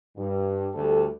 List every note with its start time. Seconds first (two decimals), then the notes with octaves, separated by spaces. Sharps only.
0.17 G2
0.75 D2 G3 A4